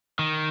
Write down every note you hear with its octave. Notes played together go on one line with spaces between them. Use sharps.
D#3